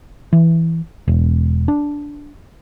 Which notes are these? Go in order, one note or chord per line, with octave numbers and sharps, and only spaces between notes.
E3
E1
D4